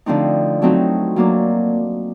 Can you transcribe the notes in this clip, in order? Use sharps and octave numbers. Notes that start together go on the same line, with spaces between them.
D3 F3 A3 C4 D#4
F#3 A3 C4 D#4 F#4
F#3 A#3 D4